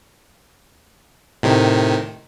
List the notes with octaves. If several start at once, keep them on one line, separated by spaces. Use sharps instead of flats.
A2 C3 D#3